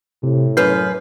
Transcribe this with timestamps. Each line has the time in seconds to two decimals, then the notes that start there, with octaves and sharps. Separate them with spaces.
0.23 A2 C3
0.57 F#2 B4 F6 G6 C7